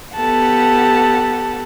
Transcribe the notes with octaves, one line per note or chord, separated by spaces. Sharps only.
B3 G4 A4 F#5 A5